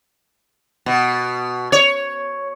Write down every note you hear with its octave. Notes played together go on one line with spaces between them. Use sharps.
B2
C#5